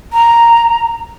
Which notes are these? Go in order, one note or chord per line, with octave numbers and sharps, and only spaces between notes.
A#5